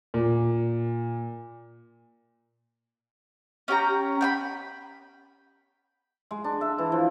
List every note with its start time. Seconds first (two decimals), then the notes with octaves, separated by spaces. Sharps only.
0.14 A#2
3.68 C#4 G4 G5 A#5
4.21 G5 G#5 B5
6.31 G#3
6.44 D4
6.61 E5
6.78 E3
6.92 F3